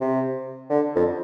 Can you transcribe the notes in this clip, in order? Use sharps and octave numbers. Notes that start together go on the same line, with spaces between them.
C3
D3
F2